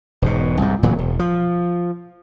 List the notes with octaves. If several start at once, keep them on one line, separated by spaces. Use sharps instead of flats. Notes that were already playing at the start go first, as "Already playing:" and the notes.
E1 G#2 B2
C2 G#2
D1 A#2 E3 F#3
E1
F3